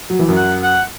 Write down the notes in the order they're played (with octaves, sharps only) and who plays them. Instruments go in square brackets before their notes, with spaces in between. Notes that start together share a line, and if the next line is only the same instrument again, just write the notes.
[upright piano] F#3
E3
F#2 F#3
[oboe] F#5
F#5